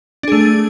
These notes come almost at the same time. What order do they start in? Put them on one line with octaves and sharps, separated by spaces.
D4 G#4 A3